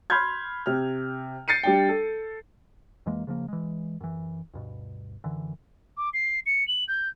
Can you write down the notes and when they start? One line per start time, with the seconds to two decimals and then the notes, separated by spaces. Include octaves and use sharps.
0.10 B5 C6 F6 G6 G#6
0.66 C3 F6
1.48 G6 A6 C7 C#7 D#7
1.63 G3 D4 G5
1.89 A4
3.06 F2 E3 G#3 A#3
3.27 C#3 F3 A3 A#3
3.48 E3 G#3
4.01 F#2 E3
4.54 D2 G2 B2
5.24 F#2 D3 E3
5.97 D6
6.13 C7
6.46 C#7
6.67 F#7
6.88 G6